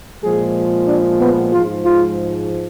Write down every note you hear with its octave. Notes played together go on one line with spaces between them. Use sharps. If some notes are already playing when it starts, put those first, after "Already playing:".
A#2 F3 G#3 G#4
D4
B3
G#2 F3 G#3 F4
F4